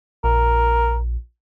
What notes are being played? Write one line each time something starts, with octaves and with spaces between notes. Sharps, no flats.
A#1 A#4